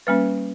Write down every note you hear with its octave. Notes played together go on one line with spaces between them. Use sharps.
G3 A#3 C#4 B4